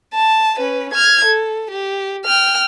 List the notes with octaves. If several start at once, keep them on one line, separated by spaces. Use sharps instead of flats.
A5
C#4 B4
F6 G#6
A4
G4
G5 F6